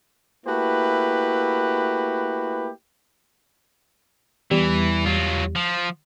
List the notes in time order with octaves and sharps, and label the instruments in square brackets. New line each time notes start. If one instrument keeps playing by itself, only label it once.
[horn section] A3 A#3 E4 F#4 G4 B4
[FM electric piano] E2 G3 [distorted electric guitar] E3
[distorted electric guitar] F#3 F4
F3